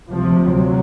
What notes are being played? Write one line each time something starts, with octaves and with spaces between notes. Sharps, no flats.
D2 C3 F3
F#3